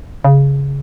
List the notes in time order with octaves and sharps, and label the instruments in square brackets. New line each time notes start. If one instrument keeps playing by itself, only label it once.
[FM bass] C#3